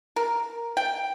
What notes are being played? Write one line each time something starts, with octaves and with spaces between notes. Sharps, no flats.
A#4
G5